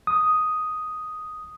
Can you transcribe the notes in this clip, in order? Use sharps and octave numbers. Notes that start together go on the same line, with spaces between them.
D#6